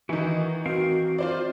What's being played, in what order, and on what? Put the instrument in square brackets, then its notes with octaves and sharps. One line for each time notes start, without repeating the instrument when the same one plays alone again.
[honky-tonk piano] D#3 E3 [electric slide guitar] D#4 E4 F#4
[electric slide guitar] C4 A#4 F5 [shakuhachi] F#4
[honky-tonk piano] F4 C5 D5